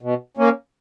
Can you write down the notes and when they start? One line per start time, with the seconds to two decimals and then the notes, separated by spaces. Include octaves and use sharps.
0.02 B2
0.37 A#3 C#4